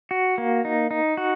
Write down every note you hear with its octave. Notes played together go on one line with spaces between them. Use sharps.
F#4
A#3
D#4
D#4
F#4